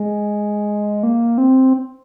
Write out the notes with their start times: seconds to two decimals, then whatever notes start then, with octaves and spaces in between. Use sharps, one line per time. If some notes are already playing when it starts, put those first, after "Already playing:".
Already playing: G#3
1.03 A#3
1.38 C4